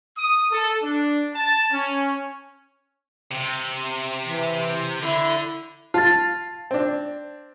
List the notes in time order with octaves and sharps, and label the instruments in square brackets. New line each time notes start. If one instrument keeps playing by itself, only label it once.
[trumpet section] D#6
A4
D4
A5
C#4
[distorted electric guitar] C3
[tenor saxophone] E3
[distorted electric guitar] D3 [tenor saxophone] E4
[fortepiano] F4 [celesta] A5 A6
[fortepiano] C4 D4